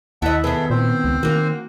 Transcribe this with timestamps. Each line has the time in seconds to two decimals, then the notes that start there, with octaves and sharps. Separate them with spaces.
0.22 D#2 E4 D#5 F#5 A5
0.44 D#3 B3 E4 G#4 A4
0.70 A#2 C4 C5
1.04 C#2
1.23 D#3 A#3 F#4